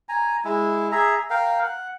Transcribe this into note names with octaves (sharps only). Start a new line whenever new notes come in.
G#5 A#5
G#3 E4
G#4 E5 A#5
A#4 F5 G5
F#5